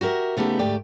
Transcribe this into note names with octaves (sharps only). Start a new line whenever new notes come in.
F#4 G4 A#4 E5
C#3 A3 B3 D#4 G4
D2 G#2 A3 G4 D5 G5